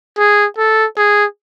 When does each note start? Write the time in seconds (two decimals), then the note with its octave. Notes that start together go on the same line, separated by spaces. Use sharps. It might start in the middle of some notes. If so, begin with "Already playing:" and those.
0.18 G#4
0.58 A4
0.97 G#4